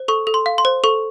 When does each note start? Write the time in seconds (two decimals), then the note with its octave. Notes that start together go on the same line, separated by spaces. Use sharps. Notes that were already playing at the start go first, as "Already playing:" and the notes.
Already playing: C5
0.08 A4 C#6
0.27 A4
0.34 C6
0.46 F5
0.58 C6
0.65 C5
0.84 A4 C#6